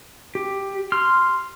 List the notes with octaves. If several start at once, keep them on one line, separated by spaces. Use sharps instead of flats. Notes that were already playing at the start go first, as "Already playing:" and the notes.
G4
C6 F6